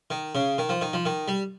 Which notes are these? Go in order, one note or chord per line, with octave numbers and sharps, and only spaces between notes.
D#3
C#3
D#3
F3
D#3
F3
D#3
G3